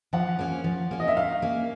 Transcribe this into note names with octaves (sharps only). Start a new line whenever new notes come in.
F3 F#5
A#3 C#4
F3
A#3 C#4
D#5
E5
F#3 F5
A#3 C#4